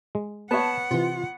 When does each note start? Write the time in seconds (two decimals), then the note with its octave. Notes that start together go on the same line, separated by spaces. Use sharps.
0.15 G#3
0.51 B3 C#5 F#5 A5
0.91 C3 E3 F4